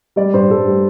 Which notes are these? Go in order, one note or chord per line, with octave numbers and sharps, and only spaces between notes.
G3 D5
G2 C5
G2 A4
G3